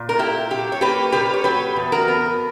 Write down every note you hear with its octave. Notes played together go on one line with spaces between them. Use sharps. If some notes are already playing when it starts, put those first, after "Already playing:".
Already playing: A#2
A#4
E4 G4
F#3 G4
C#5
A#3 G4 B4
A#2 G4 B4
C#5
F#3 G4 B4
E2
F#4 A#4
B3